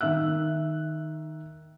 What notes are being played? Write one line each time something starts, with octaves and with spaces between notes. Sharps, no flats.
D#3 E5 E6 F#6